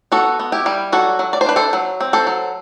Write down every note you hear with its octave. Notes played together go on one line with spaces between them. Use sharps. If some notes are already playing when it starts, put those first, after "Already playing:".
B3 F#4 A4
B3
E4 G4
G3
F#3 F#4 A4
F#3
D5
C5
D4 B4
A4 C5
F#3
C4
A4 C5
F#3